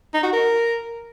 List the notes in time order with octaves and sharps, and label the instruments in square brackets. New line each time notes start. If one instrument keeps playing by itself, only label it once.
[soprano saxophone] D#4
F#4
A#4